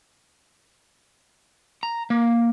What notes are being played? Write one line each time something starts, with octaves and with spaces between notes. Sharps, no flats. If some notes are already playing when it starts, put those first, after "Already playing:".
A#5
A#3